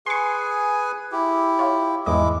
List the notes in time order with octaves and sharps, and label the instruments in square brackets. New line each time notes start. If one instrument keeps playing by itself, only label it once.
[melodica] G#4 B4 G#5 [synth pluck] C6 C#6
[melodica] E4 G4
[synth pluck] F4 C#5
[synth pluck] E2 G#2 D#5 [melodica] G#3 E4 D6